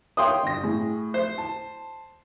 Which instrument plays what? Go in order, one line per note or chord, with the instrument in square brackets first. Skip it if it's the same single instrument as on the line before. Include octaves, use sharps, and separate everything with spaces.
[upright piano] C#5 E5 F5 [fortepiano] G5 C6 D#6
[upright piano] G1 A#6
A2 G#4
[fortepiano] C5
[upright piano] A5